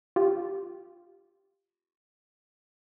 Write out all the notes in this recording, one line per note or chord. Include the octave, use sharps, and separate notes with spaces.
F4 G4